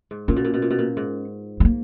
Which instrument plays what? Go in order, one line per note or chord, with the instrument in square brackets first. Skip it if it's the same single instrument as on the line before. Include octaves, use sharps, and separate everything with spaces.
[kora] G#2
[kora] A#2 [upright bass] C#4
[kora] B2
A#2
B2
A#2
B2
A#2
G#2
[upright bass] G#3
A#3